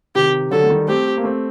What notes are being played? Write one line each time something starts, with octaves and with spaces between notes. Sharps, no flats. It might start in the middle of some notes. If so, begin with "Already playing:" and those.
C3 D#3 G4
D3 F#3 A4
A3
D#3 G3
A3 C4 G4
A#3
A3 C4